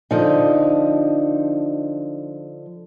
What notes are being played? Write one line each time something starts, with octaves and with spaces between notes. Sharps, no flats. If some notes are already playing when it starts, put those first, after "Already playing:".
D3 F3 D#4